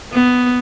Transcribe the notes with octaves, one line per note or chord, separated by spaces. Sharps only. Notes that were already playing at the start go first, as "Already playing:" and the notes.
B3